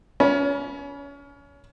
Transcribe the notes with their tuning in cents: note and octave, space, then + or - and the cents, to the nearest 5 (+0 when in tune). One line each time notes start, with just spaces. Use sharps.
C#4 +30 B5 -25